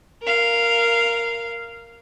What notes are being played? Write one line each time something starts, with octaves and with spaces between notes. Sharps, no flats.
A#4 F5